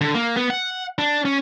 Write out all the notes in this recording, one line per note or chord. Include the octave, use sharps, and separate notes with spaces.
D3
A#3
B3
F#5
D4
C#4